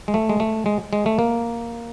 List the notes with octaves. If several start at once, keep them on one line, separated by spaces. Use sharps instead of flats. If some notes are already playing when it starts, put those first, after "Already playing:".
G#3
A3
G#3
A3
G#3
G#3
A3
A#3